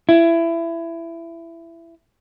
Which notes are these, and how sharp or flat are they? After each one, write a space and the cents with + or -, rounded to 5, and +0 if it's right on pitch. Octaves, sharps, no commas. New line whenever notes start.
E4 +20